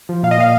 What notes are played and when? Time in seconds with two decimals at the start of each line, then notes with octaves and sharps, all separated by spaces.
0.09 F3
0.23 A#2 F5
0.31 D#5
0.38 A#2 F5